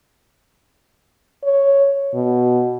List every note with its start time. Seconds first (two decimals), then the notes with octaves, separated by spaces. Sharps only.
1.44 C#5
2.14 B2